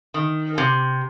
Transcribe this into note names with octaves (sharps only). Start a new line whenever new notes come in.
D#3
C3